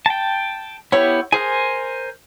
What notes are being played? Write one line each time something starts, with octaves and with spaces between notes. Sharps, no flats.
G5 A5
B3 E4 G4 C#5
G#4 A#4 C5 G#5